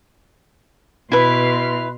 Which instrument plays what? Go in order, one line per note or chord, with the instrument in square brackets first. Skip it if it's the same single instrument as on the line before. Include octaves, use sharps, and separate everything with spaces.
[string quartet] B2 C6 F6 [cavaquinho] E4 B4